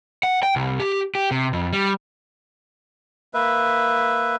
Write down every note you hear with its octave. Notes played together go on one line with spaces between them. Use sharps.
F#5
G5
C2
G4
G4
C3
F2
G3
A#3 B4 E5